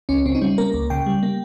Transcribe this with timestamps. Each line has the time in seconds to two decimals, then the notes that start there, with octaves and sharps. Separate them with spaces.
0.09 C#2 C#4
0.25 C#3 C4
0.35 D#4
0.41 G3 C#4
0.58 A#3 A#4
0.74 C#2
0.90 C#3 G5
1.06 G3
1.23 A#3